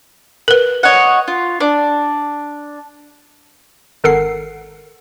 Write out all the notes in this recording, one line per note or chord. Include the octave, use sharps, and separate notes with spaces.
A#4 B4
C#5 D#5 F#5
F4
D4
G#1 A4 A#4 F#5 C7